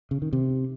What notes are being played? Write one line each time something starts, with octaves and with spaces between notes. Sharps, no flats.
C#3
D#3
C3